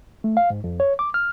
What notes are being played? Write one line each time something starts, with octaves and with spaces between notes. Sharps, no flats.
A3
F5
G#2
F2
C#5
D6
F6